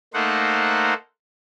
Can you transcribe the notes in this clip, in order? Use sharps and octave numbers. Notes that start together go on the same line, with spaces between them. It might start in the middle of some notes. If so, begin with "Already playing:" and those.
A3 A#3 D#4 C5 F#5